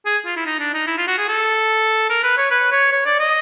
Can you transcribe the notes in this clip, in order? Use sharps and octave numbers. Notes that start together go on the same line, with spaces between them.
G#4
F4
E4
D#4
D4
D#4
E4
F4
F#4
G#4
A4
A#4
B4
C#5
B4
C#5
C#5
D5
D#5